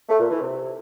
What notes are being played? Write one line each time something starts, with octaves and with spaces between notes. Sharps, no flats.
A3
A#2
E3
C3